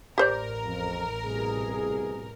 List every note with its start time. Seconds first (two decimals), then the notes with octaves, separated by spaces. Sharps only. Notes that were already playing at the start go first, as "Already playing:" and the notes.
0.18 A1 G4 A#4 C5 D5
0.64 F2
1.24 C2 B2 G#4